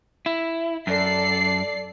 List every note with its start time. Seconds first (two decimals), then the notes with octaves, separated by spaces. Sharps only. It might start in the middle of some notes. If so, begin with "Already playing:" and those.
0.26 E4
0.87 F#2 A4 D5 C7